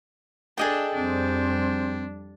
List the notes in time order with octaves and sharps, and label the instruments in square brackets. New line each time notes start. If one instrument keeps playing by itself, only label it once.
[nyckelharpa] D4 A4 [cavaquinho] G#4 D#5 G5
[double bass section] F2 G3 [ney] C4 [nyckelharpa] D4